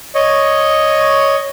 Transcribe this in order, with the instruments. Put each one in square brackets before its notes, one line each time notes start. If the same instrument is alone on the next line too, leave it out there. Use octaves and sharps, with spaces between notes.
[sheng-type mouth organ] C#5 D#5